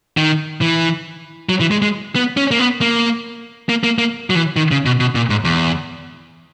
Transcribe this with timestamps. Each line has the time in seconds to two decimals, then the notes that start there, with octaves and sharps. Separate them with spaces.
0.17 D#3
0.61 E3
1.49 F#3
1.61 E3
1.71 G#3
1.82 G#3
2.15 B3
2.37 C#4
2.51 A#3
2.59 B3
2.81 A#3
3.69 A#3
3.84 A#3
3.98 A#3
4.30 F#3
4.35 E3
4.56 D#3
4.71 C#3
4.86 B2
5.00 B2
5.15 A#2
5.30 G#2
5.45 E2